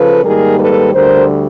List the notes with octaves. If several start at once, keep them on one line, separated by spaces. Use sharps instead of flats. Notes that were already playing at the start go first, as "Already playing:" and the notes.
Already playing: C#3 F3 A4 B4
G#2 D#3 G3 A#3 G#4 A#4
A4 B4
D2 D3 G3 A#4 C5